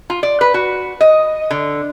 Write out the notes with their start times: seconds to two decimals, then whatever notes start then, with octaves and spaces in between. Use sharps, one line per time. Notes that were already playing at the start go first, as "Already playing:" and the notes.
0.10 F4
0.23 D5
0.41 B4
0.54 F#4
1.01 D#5
1.51 D3